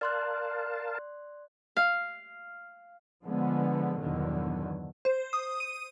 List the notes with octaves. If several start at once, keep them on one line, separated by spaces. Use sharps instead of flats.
A#4 D5 F5 A5 C6 F#6
F5
D3 F3 G#3 B3
E2 G2 B2 D3 D#3 F#3
C5
D#6
D#7